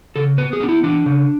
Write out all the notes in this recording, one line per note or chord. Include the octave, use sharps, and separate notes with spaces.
C#3 A4
B3 B4
G#4
B3 D4
E4
E3 D4
C#3